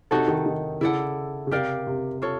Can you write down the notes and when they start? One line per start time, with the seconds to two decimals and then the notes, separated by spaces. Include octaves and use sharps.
0.11 C3 D#4 F#4 A4 C#5
0.28 D#3
0.46 D#3
0.81 C#3 E4 A4 D5 F#5
1.47 C#3
1.51 C3 G4 A#4 D5 F5
1.87 C3
2.22 F4 A4 C#5